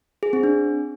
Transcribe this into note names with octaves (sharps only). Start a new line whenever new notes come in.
G#4
C4
D4